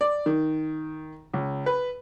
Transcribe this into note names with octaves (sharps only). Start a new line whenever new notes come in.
D5
D#3
C#2
B4